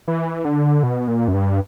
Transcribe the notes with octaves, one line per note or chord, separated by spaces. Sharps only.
E3
D3
B2
A#2
F#2
G2